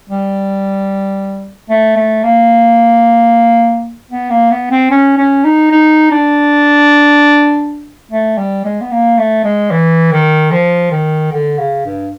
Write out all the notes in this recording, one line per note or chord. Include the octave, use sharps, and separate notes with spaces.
G3
A3
A3
A#3
B3
A#3
B3
C4
C#4
C#4
D#4
D#4
D4
A3
G3
G#3
B3
A#3
A3
G#3
E3
D#3
F3
D#3
D3
C#3
G2